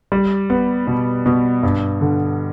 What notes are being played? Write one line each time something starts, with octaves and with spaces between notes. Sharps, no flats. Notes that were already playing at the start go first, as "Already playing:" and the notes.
G3
B3
B2
B2
G2
D3